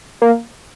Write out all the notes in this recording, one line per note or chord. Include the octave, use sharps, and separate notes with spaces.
A#3